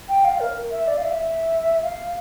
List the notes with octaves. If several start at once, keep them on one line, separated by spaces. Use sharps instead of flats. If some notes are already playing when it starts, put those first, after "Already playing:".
G5
F5
A#4
E5
D5
F5
E5
F5